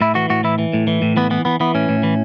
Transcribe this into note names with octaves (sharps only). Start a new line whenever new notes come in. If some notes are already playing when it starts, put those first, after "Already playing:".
A2 E4
E3 F#4
A2 F#4
E3 E4
E3
A2
E3
A2
E3 B3
E3 B3
E3 B3
E3 B3
A2 C#4
A2
E3